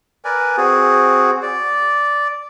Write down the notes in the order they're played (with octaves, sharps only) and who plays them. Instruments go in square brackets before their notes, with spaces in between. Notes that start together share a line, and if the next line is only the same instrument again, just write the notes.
[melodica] A#4 B4 D5 G#5
C4 F#4 G#4
D5